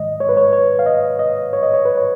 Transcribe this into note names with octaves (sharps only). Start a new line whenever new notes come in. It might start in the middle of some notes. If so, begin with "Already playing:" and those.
Already playing: G#2 D#3 G#3 D#5
C#5
B4
C#5
C#5
F5
D#5
D#5
C#5
D#5
C#5
B4
C#5